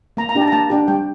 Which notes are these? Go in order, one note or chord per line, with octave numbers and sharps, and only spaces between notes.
A#3 A#5
A#5
D4 G4
A5
A#5
A#3 A5
D4 G4
G3 G5